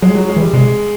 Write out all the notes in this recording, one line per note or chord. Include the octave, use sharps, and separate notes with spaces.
F#3 G#3
F#3
G#3
E3
G3
C3 G#3